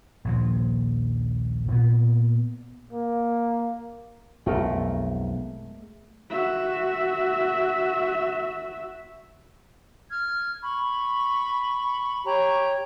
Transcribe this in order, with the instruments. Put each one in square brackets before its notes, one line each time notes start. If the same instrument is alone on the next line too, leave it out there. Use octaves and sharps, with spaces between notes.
[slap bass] A#1 D#2 F3
A#2 B3
[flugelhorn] A#3
[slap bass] B1 F2 [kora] G#3 A3 A#4
[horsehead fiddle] F#4 E5
[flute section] F6 G#6
B5 C#6
G4 C#5 A#5 C#6